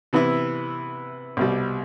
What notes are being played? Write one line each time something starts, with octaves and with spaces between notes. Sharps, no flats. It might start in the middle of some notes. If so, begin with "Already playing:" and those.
C3 E3 B3 E4
C2 B2 G3